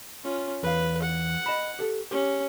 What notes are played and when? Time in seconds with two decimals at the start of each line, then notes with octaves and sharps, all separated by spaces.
0.24 C#4 F4
0.63 E2 B4 F5
1.02 F#5
1.46 D#5 A5 B5
1.79 G4 A4
2.11 C#4 G4